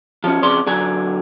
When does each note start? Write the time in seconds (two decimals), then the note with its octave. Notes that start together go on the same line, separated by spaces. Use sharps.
0.24 F3 C#4
0.42 F2 C#3 D5 C6
0.67 D3 F#3 G#5